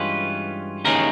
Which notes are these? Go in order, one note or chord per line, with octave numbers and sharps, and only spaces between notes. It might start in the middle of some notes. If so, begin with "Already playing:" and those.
Already playing: G2 E3 G#3 C#4 F4 B4
D#2 C#3 E3 G#3 C#4 A#4 A#5